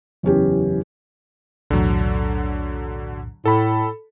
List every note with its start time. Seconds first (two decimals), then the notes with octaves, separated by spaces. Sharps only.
0.23 F#1 E2 C#4 G4
1.71 B1 E2 A2 D3 F#3
3.45 A2 A4 B5